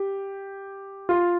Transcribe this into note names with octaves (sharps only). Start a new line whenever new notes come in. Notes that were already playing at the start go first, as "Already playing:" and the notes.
Already playing: G4
F4